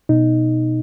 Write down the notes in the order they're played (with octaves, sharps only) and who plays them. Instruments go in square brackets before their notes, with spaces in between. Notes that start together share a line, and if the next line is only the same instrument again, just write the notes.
[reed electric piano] B2 D#4